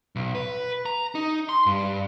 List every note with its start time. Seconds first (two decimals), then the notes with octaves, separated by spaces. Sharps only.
0.16 B1
0.35 B4
0.86 A#5
1.15 D#4
1.49 C6
1.66 G2